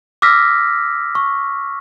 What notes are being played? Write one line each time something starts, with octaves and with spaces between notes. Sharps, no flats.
D6 E6 F6 A#6 B6
C#6